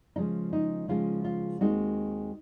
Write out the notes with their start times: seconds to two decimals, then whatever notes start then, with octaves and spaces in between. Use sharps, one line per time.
0.16 C#3 F3 G#3 C#4 D#4
0.53 D#4
0.88 C#3 F3 G#3 C#4 F4
1.24 F4
1.61 D#2 D#3 G#3 C4 D#4 F#4